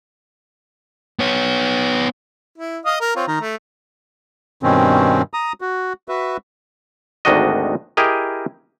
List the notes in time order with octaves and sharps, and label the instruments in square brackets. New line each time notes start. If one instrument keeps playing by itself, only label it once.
[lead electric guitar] B3 C#5
[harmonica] E4
D#5 F5 D#6
A#4
C4 F4 C#5
D#3 A#5
A3
[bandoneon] G2 B2 D#3 C4 C#4
A#5 D#6
F#4
F#4 B4 E5
[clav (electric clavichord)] G#1 D2 D#3 D4 F#4 D#5
E4 G4 G#4 A#4 D#5